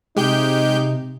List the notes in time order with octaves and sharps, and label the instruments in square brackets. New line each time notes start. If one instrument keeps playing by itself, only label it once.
[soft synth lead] C3 [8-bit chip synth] G#3 G4 G6 [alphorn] D#4